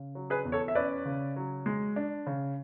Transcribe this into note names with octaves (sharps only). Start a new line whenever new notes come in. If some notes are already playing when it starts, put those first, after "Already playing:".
Already playing: C#3
F#3
G#4 B4
E2
A4 C#5
E5
C#4 B4 D5
C#3
F#3
G#3
D4
C#3